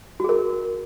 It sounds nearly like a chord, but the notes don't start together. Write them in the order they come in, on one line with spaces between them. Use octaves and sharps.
F#4 G#4 A#4